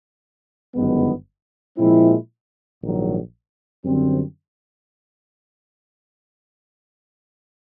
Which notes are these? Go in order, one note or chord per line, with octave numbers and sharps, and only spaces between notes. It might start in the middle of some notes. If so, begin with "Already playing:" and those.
G1 F#2 D#3 G#3 B3
A#2 F3 G#3 C4 E4
A#1 G#2 D#3 F#3
F#2 D3 G3 C4